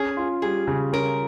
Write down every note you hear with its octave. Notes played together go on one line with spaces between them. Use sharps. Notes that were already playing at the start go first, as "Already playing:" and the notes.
Already playing: C#4 G#4
F4
G3 G#4
C#3
C#4 A#4